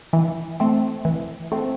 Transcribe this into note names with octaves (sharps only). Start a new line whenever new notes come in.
E3
A3 C4
E3
A3 C4